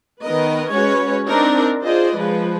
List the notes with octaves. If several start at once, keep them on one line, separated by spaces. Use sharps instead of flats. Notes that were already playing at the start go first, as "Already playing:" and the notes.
D#3 B3 A#4 B4 D#5
G#3 C#4 F#4 B4 C#5
C4 D4 D#4 A#4
F4 G#4 C5 D5 D#5
F3 G#3 B4